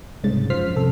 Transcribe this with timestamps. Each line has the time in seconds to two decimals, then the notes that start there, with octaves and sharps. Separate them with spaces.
0.24 C2 G#2 C#3 A6
0.50 F#2 F3 C5 F6 B6 C7
0.76 C2 F2 A4